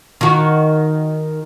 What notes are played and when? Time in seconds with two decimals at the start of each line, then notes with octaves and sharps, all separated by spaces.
0.21 D#3 F#4